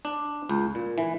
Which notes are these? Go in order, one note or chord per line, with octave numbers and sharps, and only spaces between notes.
D4
C#2
A#2
E3